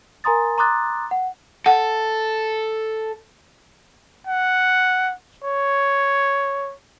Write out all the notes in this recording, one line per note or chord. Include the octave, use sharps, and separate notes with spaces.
A#4 G#5 A#5 C6 D#6 A6
A#5 C6 D6 D#6 F#6 A6
F#5
A4 F#5
F#5
C#5